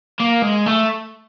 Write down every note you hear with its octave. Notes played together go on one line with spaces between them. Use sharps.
A#3
G#3
A3